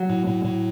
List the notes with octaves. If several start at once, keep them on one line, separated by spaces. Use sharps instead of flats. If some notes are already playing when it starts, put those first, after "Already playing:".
Already playing: F#3
A2
A2
A2